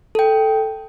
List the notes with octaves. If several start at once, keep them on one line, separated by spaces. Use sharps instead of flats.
A4 G5